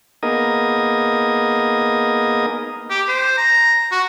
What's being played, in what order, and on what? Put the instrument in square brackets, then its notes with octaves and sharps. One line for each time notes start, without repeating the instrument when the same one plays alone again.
[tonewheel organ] A#3 B3 D#4 G#4 A#4 D#5
[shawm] G4
C5
A#5
F#4